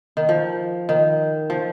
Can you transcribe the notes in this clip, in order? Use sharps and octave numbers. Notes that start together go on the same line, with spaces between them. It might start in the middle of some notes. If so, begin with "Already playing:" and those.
D#3
F3
D#3
F3